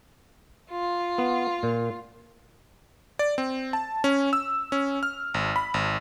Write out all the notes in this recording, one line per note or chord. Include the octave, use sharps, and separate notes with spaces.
F4
B3
A#2
D5
C4
A5
C#4
E6
C#4
F6
G#1
B5
G#1